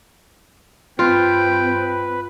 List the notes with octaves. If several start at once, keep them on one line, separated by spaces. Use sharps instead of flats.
G2 C4 F4 B4 G5